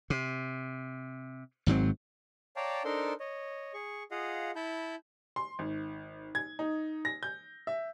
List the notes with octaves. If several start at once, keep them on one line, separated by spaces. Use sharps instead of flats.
C3
G#1 G#2 F#3 C4
C#5 D5 F5 G5 A5 A#5
D4 D#4 A4 A#4 C5 C6
C#5 D#5
G#4 C#6
F4 G#4 D#5 F5 F#5
E4 A5 B5 G6
C6
G#1
G#6
D#4
A#6
G6
E5